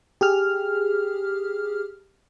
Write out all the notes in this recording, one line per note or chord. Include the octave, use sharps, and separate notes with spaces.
G4 G#4 F6